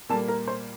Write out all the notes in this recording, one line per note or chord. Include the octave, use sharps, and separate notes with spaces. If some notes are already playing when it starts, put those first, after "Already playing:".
A#2 G3 A#3 A4 A5
A#4 A#5
C5 C6